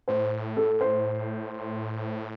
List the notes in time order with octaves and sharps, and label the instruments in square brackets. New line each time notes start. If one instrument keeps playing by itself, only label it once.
[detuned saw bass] A2 [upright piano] C5
[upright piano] A4
C5